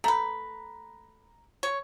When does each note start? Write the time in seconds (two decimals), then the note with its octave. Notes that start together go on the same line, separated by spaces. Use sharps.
0.04 A3 B4 A#5
1.63 C#5